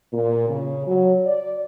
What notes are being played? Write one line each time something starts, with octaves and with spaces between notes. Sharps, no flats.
A#2
C#3
F#3
D5